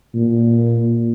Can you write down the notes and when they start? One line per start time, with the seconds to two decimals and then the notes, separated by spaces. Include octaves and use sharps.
0.14 A#2